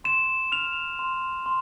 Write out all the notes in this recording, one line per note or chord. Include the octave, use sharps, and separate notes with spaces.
C6 E7
F6 F7
C6
C6